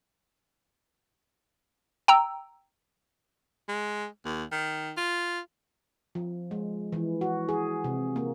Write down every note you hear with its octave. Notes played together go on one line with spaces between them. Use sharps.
G5 A#5 E6
G#3
D#2
D#3
F4
F3
G#3
E3
F#4
G#4
C3
A#3